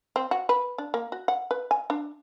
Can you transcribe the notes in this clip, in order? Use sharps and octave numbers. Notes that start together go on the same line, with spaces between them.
C4
F#4
B4
D4
A#3
F#4
F#5
B4
G#5
D4